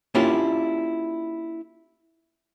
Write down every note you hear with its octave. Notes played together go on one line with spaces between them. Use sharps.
A#3 C#4 D4 E4 F4 G4